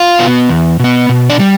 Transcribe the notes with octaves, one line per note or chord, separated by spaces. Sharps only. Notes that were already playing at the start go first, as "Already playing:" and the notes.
Already playing: F4 F5
B2 B3
E2
B2 B3
B2
D4 D5
G3